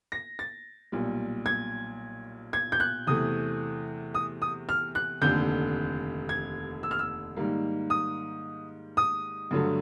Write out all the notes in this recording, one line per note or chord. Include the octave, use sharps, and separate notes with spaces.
A#6
A6
B1 A#2 G3
G#6
G#6
G6
F#6
E2 C3 E3 A3 D#6
D#6
D#6
F6
F#6
F1 D#2 D3 G6
G#6
E6
F6
E6
G#2 D#3 G3 A#3
D#6
D#6
G2 D3 F#3 A3